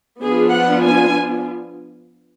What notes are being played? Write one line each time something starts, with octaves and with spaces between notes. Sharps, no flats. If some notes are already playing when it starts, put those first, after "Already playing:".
F3 B3 D4 F4 G#4
F#5
G#5